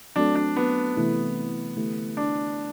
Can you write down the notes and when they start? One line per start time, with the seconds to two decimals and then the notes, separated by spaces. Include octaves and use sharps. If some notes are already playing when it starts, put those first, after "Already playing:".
0.16 F#3 A3 C4 D4 F#4 A4
0.35 D4
0.57 B3
0.96 C3 E3 A3 E4 G4
1.77 D3 A3 E4 G4
2.17 D4